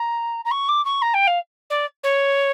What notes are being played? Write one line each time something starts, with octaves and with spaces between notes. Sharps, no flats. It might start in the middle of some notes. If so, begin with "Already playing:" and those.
Already playing: A#5
A#5
C#6
D6
C#6
A#5
G5
F5
D5
C#5